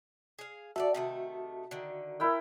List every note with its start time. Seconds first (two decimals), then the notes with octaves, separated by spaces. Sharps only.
0.39 G#4 F5
0.76 F#4 A4 B4 D5 E5 A5
0.94 C3 D#3 A3
1.71 D3 D#3
2.20 E4 A#4 G5